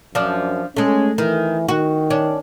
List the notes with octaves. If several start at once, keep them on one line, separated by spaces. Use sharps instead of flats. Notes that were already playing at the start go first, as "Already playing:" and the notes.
F#2 F3 D4
G#3 A3 C#4
D#3 E3
D#3 F#4
C#4 D4